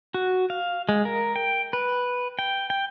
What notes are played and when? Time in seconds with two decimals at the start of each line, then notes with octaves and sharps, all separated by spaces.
0.14 F#4
0.50 F5
0.89 G#3
1.05 A#4
1.36 G5
1.73 B4
2.39 G5
2.70 G5